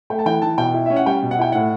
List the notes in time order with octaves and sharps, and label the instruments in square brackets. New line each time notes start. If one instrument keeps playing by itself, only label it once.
[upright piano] A3 G5
A5
E3 G5
E3 A5
B2 G5
E4
C#4 E5
F#5
G3 G5
B2
F#5
E4 G5
A2 F#5